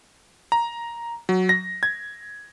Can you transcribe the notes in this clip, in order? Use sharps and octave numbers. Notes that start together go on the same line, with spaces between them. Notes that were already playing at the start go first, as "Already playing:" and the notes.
A#5
F#3
A#6
G#6